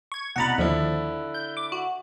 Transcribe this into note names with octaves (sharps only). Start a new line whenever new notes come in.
C#6 G#6
C2 B2 F#5 A#5 B5 A6
D#2 D3 F3 E4
G6
D6
F#4